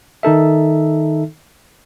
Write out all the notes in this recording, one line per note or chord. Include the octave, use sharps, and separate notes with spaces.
D#3 D#4 A4 E5